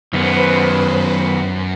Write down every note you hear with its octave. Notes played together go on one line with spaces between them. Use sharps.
F#2 D#3 B3 B4 C5